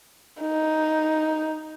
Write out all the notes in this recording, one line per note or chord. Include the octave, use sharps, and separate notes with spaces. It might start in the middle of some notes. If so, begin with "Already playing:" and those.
D#4